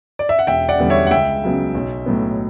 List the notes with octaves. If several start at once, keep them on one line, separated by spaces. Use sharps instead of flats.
D5
E5
F#5
E1 E5 G5
D5 F#5
E2 D3 G3 B3
C#5 E5
F#5
C#2 E5 G5
C#3 F#3 B3
B1
A2 F#3 B3